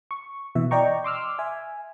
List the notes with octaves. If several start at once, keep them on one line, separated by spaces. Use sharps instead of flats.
C#6
B2 E3 E5
D5 D#5 G5 A#5 C#6
C6 D6 E6 F6
E5 G#5